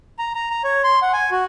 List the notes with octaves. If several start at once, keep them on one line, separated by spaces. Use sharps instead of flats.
A#5
A#5
A#5
C#5
C6
F#5
G#5
F#4